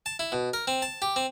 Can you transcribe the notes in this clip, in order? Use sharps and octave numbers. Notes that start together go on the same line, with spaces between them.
A5
E4
B2
A#4
C4
A5
G4
C4